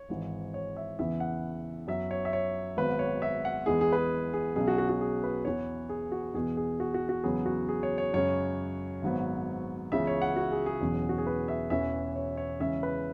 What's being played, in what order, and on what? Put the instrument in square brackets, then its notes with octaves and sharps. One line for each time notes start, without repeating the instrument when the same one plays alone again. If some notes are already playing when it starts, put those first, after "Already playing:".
Already playing: [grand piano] C#5
G#1 G#2 E3
C#5
E5
E2 C#3 E3 B3 E5
F#5
F#2 F#3 B3 E5
C#5
E5
C#5
G#1 G#2 F#3 B3 B4
C#5
E5
F#5
E2 E3 G#3 B3 G#4
G#4
B4
G#4
G#4
B1 B2 F#3 C#4 G#4
F#4
F#4
F#4
G#4
B4
E2 E3 B3 C#5
G#4
F#4
E2 B2 B3 G#4
G#4
F#4
F#4
F#4
E2 C#3 F#3 B3 G#4
F#4
G#4
C#5
C#5
F#2 C#3 G#3 C#4 C#5
G#1 G#2 F#3 B3
C#2 C#3 E3 B3 E5
C#5
F#5
F#4
G#4
G#4
E1 E2 B2 F#3 C#4
F#4
G#4
B4
E5
E1 E2 E3 C#4 E5
C#5
C#5
E2 C#3 G#3 C#4 E5
B4